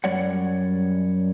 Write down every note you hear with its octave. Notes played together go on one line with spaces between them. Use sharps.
F#2 G3 C#5 D5 F#5